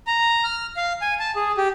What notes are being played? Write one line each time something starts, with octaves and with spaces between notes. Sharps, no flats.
A#5
F6
F5
G#5
A5
G#4
G4